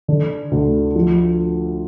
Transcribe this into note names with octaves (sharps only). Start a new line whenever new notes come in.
D3 D4
D2
F3